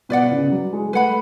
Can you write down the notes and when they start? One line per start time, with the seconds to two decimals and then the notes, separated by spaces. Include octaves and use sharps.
0.09 B2 B4 D5 F#5
0.31 C#3
0.51 F#3
0.73 G#3
0.93 A3 B4 F#5 B5